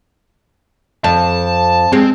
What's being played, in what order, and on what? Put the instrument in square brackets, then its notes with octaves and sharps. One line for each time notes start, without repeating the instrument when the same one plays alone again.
[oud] F2 [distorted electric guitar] A5
[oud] G#3 [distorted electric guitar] C4